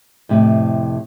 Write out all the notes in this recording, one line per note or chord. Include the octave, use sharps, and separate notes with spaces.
F2 A2 C3